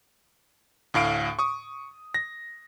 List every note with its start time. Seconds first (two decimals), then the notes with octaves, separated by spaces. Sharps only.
0.94 D2 A2 F5 D7
1.39 C#6 D#6
2.14 A#6